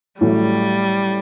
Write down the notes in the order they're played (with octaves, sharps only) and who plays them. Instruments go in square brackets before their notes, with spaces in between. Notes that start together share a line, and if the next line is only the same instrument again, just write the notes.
[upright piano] A1 A2 F#3 A3 [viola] G3